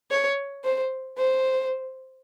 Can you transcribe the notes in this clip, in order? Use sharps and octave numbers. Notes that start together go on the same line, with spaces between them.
C#5
C5
C5